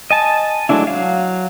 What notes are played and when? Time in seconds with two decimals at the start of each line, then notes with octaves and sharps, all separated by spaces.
0.11 D#5 G#5 A5
0.69 F#3 G#3 A3 D4 E4
0.87 F#3 F5